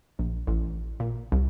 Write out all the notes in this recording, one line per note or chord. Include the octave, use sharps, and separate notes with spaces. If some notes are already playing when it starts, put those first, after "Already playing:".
A#1
A1
A#2
C2